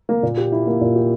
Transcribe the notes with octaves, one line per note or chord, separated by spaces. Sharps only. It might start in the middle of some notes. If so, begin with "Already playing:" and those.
A#3
A#2
G4
E4
A#3
A#2
G4